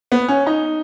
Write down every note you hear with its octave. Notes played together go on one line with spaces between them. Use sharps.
B3
C#4
D#4